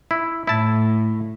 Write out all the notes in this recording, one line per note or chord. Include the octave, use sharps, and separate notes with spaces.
E4
A2 E4 A5